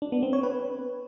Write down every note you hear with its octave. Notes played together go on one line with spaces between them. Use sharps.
D4
B3
C4
C#5
B4